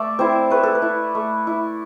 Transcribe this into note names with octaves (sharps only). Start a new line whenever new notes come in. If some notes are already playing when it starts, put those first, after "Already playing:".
Already playing: A3 D5 E5
C4 E4 C5
A3 B4
A4
B4
E4
A3
E4